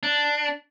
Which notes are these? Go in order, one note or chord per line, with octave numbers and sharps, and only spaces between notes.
D4